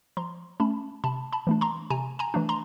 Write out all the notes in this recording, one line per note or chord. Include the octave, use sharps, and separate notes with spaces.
F3 A#5 C6
A3 C#4 A5 B5
C3 A5 B5
A5 B5
E3 A3 D4
A#5 C6
C3 G#5 A#5
G#5 A#5
E3 A3 D4
A#5 C6